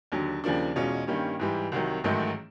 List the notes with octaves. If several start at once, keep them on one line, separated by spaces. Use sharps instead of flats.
D#2 D3 F#3
D#2 C#3 F3 A#3 D4
E2 B2 G#3 C#4 F4
G2 D#3 G3 A#3 C#4
G#2 E3 G3
C2 C3 D#3 F#3
A1 G#2 D#3 F#3 A3